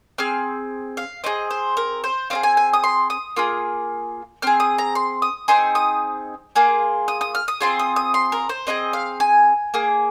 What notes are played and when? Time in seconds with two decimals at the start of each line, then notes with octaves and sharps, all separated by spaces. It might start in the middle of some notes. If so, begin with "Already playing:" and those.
0.18 C4 G#4 F6
0.97 F5
1.24 C4 F4 G#4 D#5
1.51 C5
1.77 A#4
2.04 C5
2.30 C4 D#4 G#4 F5
2.43 G#5
2.57 G#5
2.73 D#6
2.84 C6
3.10 D#6
3.36 A#3 F4 G#4
4.42 C4 G#4 F6
4.60 D#6
4.78 A#5
4.95 C6
5.22 D#6
5.48 C4 D#4 G#4 C6
5.75 D#6
6.56 A#3 F4 G#4
7.08 D#6
7.21 D#6
7.35 F6
7.48 D#6
7.61 C4 F4 G#4 C6
7.79 D#6
7.96 D#6
8.14 C6
8.32 A#4
8.49 C5
8.67 C4 D#4 G#4 D#5
8.93 F5
9.20 G#5
9.74 A#3 G#4